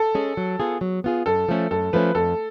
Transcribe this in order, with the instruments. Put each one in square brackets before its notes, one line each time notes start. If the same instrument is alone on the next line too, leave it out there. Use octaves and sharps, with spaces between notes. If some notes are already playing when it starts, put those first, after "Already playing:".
Already playing: [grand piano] A4
[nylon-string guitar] G#3 C#4 G#4
F#3
B3 F4 G#4
F#3
B3 F4 G#4
[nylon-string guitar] F#2 [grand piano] A4
[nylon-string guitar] F3 A3 C#4
[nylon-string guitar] F#2 [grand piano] A4
[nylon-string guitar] F3 A3 C#4 [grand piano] B4
[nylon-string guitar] F2 [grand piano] A4